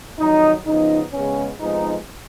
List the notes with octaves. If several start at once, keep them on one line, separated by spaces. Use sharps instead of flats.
F2 D#3 F#3 D#4
C#3 F3 B3 D#4
C#3 G#3 B3 C#4
F2 F3 G#3 B3 D#4